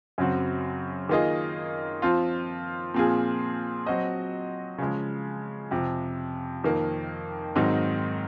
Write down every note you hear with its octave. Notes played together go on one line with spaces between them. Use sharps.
F#2 C#3 F#3 C4 F#4
D#3 A#3 F4 G#4 D#5
F3 C4 F4
A#2 F3 C4 F4 G#4
F#3 C4 F#4 C5 D#5
C#3 F3 G#3
F2 C3 F3
F2 D#3 A#3
G#2 D#3 F#3 C4 D#4